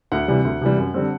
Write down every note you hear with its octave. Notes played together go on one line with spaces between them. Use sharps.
D2 F#5
C3 E3 G3
D2
C3 E3 G3
F#2
D3 G3 C4